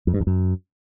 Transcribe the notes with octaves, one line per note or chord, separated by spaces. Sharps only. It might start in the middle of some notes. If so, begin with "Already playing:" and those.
F2
G2
E2
F#2